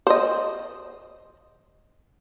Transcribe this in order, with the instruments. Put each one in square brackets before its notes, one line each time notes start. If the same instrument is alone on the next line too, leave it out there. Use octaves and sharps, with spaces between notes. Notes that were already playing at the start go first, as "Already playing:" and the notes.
[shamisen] C5 D#5